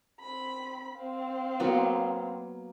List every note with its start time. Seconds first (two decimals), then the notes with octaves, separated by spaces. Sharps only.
0.20 C4 B5
0.95 C4 F5
1.60 F#3 A#3 B3